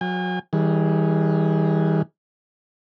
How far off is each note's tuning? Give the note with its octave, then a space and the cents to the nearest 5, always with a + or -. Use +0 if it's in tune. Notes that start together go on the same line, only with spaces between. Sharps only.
F#3 -30 G#5 -40
E3 -45 G3 +5 G#4 +0